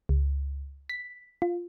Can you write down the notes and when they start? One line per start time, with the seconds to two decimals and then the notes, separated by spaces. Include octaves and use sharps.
0.09 C#2
0.89 B6
1.42 F4